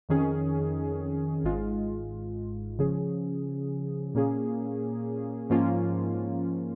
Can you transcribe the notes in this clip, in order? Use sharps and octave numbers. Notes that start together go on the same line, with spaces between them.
F2 D#3 C#4 G#4
G#1 G#2 G#3 F4
C#3 F3 C#4 G#4
A#2 A#3 C#4 G#4
G#2 F3 A#3 C#4 F4